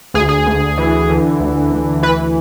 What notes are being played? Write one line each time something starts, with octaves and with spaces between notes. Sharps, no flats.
D2 G#4
G#4
D2
E3
D3
D2
D2
E3 B4